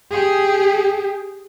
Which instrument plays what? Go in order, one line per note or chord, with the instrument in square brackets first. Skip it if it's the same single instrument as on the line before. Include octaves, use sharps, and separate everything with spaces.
[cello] G4 G#4